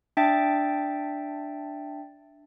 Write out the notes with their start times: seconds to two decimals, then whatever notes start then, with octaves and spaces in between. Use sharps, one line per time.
0.17 D4 E5 G5 A5 A6